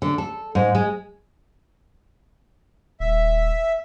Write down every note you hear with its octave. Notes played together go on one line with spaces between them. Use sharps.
D3
A4
G#2
G#3
D#1 E5